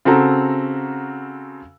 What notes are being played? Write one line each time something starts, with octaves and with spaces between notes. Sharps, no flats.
C#3 C4 F#4 A4 A#5